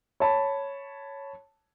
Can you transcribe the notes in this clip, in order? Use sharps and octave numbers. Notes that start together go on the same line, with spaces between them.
C#5 A5 B5